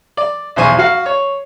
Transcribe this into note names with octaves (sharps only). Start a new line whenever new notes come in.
D5
B1 E2 E3 C5 G#5 C#6
F#4 F5 F#5
C#5